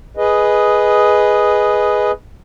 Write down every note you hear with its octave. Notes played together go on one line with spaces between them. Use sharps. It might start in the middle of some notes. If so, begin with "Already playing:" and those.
G#4 B4 D#5